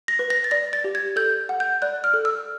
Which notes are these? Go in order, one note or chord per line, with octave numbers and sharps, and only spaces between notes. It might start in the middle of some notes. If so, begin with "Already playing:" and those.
A#6
B4
A#6
A6
D5 A#6
A6
G4
G#6
A4 G6
F#5
G6
D5 F#6
F6
A4
E6